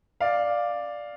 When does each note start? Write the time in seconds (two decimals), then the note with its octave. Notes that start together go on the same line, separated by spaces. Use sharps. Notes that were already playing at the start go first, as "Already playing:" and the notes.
0.20 D5 F5